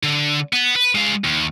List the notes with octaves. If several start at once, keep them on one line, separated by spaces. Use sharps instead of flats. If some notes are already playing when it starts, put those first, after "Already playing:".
D3
B3
B4
G#3 F5
D#2